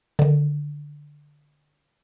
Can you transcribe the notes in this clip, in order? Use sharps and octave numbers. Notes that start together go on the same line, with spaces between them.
D3 D#3